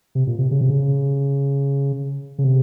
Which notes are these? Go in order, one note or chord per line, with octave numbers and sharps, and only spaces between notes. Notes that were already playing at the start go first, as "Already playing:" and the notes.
C3
A#2
C3
C#3
C3
C#3
C#3
C3